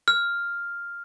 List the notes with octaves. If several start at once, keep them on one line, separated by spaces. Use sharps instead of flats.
F6